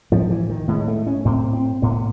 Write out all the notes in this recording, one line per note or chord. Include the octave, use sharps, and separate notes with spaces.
A2 F3
E3
D#3
A2 G#3
A3
C#4
A2 C4
C4
A2 B3